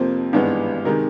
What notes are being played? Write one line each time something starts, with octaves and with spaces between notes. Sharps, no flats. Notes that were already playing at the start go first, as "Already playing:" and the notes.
Already playing: F2 C3 F3 A#3 C5
G#1 G2 E3 G#3 B3
C3 D#3 G#3 A#4